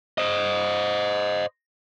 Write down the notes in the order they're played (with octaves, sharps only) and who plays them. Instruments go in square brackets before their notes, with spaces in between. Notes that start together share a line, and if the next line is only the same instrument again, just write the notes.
[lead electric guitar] C5 D#5